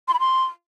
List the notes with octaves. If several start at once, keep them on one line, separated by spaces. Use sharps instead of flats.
C6
B5
C6